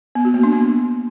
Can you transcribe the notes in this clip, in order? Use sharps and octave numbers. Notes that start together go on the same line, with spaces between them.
B3
F#4
A#3
D4
B3